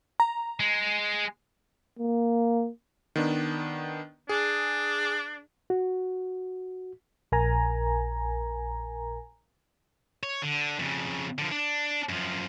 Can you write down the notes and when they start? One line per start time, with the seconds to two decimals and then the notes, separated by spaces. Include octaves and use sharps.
0.20 A#5
0.60 G#3
1.99 A#3
3.16 D#3 B3 D4
4.29 D4 G#4
5.70 F#4
7.32 A#1 A#4 G#5 A#5
10.23 C#5
10.42 D3
10.79 F2 C#3
11.38 D3 F3
11.51 D4
12.09 F#2 F3